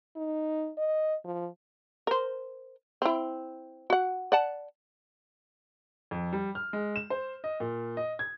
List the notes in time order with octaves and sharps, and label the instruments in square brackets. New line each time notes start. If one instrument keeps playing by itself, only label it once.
[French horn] D#4
D#5
F3
[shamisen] A#4 C5
C4 E4
F#4 F#5
D5 F#5 A5
[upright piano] F2
G3
F6
G#3
E7
C5
D#5
A#2
D#5
G#6